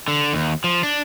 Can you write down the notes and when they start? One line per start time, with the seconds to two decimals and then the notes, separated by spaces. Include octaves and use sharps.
0.08 D3
0.33 D#2
0.64 F3
0.83 D4